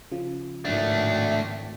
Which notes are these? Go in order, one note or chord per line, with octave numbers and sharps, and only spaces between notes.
C#3 F3
G#1 A2 D#3 A3 D4